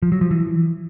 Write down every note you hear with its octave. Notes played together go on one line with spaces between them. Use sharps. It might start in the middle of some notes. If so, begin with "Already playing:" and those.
F3
F#3
F3
E3